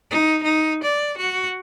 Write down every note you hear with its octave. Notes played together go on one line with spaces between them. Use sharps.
D#4
D#4
D5
F#4